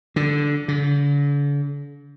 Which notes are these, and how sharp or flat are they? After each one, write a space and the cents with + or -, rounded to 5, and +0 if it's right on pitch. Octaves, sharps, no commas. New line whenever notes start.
D3 -5
D3 -45